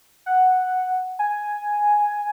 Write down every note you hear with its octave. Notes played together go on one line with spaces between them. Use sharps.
F#5
G#5